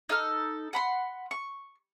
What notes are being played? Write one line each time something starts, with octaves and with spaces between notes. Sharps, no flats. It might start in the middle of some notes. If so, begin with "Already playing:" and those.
D#4 A4 F6
F#5 B5 C6
C#6